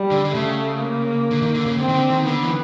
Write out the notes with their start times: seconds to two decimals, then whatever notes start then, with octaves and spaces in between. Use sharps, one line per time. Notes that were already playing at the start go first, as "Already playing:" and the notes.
Already playing: G3
0.11 D3
0.25 D3
0.34 C#3 A3
0.82 A#3
1.31 D3
1.42 D#3
1.55 D3
1.66 C#3
1.78 D3 C4
1.88 D#3
1.94 D3
2.10 D#3
2.26 D3 B3
2.43 E3